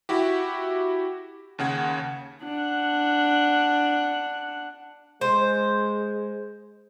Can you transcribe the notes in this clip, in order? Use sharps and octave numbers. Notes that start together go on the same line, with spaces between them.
E4 F#4 G4
D#2 C#3 F#5 G#6
D4 F#5
G#3 C5